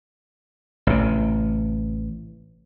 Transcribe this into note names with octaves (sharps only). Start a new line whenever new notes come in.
A1 C3